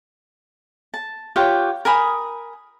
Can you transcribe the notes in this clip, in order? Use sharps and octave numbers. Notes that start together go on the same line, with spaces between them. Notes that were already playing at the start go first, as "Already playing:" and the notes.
A5
F4 G4 C#5 F#5
A#4 G#5 B5 D#6